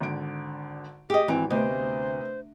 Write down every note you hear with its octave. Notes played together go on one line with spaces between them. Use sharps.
G#1 D3 D7
G4 G#4 D#5
G#1 E3 C4 D7
D2 C3 B3 C5 D#5